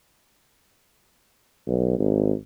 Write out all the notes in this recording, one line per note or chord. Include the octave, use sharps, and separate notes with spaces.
B1
G#1